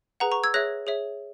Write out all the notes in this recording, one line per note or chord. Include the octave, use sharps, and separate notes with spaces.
G#4 B4 F#5 A#5
A#5 C#6
E6 G#6
G#4 C#5 E5 F#6 A#6
G#4 C#5 E5